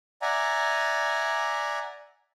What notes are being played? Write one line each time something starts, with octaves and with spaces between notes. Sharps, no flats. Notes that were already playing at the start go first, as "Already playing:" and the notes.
D5 E5 F#5 G#5 A#5